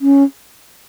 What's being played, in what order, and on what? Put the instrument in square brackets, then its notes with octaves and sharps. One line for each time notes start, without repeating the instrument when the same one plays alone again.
[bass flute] C#4